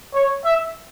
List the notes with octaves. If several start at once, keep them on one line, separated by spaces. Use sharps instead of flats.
C#5
E5